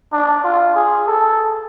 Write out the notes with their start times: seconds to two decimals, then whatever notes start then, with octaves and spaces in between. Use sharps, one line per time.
0.13 D4
0.44 F4
0.75 G#4
1.07 A4